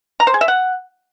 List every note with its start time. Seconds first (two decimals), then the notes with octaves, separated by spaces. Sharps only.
0.20 A#5
0.27 C5
0.34 G#4
0.41 E5
0.48 F#5